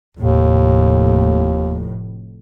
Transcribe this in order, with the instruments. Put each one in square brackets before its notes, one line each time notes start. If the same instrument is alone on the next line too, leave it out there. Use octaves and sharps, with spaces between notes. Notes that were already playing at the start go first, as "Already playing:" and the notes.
[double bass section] F1 A2 [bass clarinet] D#2